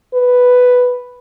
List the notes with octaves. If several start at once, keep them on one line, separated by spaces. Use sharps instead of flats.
B4